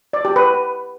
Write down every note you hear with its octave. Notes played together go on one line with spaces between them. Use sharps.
D5
G4
B4